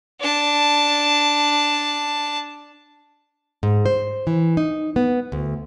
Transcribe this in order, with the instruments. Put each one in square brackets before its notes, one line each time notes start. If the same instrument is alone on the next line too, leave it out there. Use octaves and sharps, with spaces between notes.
[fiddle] D4 A5
[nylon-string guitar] G#2
C5
E3
D#4
B3
D2